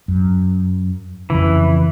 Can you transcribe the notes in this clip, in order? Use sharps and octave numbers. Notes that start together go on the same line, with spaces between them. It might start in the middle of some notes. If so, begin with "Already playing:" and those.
F#2
F2 C#3 E3